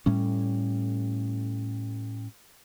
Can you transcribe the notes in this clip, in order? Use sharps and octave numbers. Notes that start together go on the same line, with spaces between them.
A2 G3 C#4